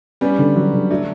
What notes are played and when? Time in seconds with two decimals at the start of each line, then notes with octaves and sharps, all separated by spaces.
0.21 G3 B3 C#4
0.39 D3
0.56 F#3
0.74 D3
0.90 F#3 A3 D4